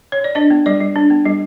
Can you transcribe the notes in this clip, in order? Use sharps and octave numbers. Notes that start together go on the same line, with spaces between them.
C#5
D5
D4 D#5
B3
G3 D5
G3
D4
B3
G3